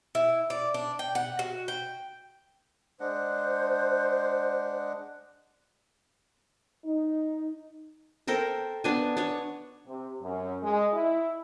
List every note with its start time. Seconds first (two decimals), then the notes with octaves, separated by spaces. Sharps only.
0.15 E4
0.50 D5
0.74 D4
0.99 G5
1.15 F#5
1.39 F#4
1.68 G5
3.00 G#3 D4 C5 F#5
6.84 D#4
8.27 A4 A#4 C5 G5
8.84 B3 D4 G#5
9.17 D4 C#5
9.86 C3
10.23 F#2
10.63 G#3
10.93 E4